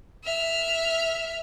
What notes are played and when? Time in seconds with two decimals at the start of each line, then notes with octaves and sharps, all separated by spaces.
0.25 E5 F6